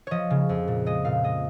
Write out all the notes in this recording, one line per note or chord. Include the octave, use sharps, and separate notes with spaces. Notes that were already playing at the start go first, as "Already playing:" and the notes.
F3 C#5 D#5
C#3
F2
A#2
G#3 D#5
A#2 F5
G#3 D#5